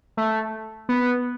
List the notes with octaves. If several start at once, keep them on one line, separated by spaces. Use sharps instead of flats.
A3
B3